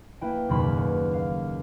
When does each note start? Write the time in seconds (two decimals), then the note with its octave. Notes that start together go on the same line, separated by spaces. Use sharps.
0.21 A#3 E4 B4 E5 G5
0.49 F#1 D#2 B2 A#4 B5 C6
0.76 A#4 B4 C#5
1.14 F5